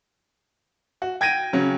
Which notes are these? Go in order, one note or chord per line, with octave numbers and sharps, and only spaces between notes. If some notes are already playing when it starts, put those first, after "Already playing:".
F#4
G5 G#6 A#6 D7 D#7
C#3 F#3 C#4